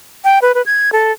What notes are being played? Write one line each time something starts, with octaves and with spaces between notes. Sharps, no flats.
G5
B4
B4
G#6
A4